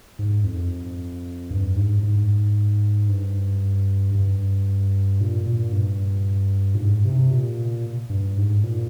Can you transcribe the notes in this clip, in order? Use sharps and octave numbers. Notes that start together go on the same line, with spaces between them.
G#2
F2
G2
G#2
G#2
G2
G2
A#2
A#2
G2
A#2
G#2
C3
A#2
G2
G#2
A#2